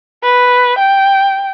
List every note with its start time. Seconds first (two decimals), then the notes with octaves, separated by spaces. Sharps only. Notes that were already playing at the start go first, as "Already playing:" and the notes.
0.23 B4
0.78 G5